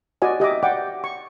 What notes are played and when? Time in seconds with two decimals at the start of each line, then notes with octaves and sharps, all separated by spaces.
0.22 F#4 D5 D#5 G#5
0.40 G4 D#5 E5 D6
0.63 D5 F#5 G5 D6
1.04 C#6